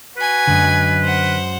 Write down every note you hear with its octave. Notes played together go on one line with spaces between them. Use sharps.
F#4 B4 G#5
F#2 D3 G#3
C5 F#5